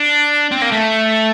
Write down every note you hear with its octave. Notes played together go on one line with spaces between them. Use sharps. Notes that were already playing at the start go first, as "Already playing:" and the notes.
Already playing: D4
C4
A#3
A3